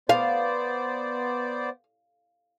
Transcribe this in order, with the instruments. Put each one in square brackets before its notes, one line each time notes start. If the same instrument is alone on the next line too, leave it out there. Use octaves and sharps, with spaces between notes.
[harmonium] B3 C5 D5 [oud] F5